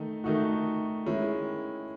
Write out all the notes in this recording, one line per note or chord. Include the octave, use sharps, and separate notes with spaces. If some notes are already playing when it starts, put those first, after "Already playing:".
Already playing: D#3 A3 D#4
D#3 A3 D#4 F#4
D#3 G#3 C#4 E4